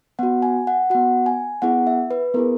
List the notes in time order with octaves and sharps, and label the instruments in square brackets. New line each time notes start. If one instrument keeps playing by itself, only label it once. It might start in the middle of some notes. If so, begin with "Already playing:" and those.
[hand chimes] B3 F#4 F#5
G#5
F#5
B3 F#4 F#5
G#5
B3 E4 G#4 F#5
E5
B4
B3 E4 G#4 A#4